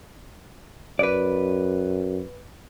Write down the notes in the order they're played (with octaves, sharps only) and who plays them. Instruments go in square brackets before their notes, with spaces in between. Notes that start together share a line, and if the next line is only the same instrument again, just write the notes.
[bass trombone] F#2 [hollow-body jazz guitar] B4 D5